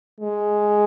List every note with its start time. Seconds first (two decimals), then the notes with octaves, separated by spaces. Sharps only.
0.20 G#3